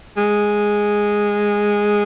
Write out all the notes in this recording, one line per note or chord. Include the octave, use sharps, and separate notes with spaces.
G#3